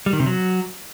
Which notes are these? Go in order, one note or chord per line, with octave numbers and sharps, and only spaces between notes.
G3
D#3
C3
F#3